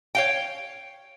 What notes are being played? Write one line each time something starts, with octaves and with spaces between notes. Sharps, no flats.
C#5 F5 G5